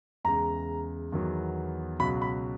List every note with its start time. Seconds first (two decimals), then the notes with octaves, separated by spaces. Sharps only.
0.24 E2 C#3 G#3 A#5
1.12 E2 D#3 F#3 B3
2.00 C#2 B2 F#3 B5
2.22 B5